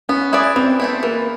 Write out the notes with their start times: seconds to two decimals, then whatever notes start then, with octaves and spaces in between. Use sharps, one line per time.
0.09 B3 C#4
0.33 E4 G#4 B4 D5
0.56 E3 C4
0.79 A3 B3 C4 E4
1.03 E3 A#3